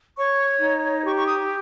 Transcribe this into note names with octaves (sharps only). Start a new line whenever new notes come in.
C#5 C#6
D#4
G4 C#6
C#6
D#6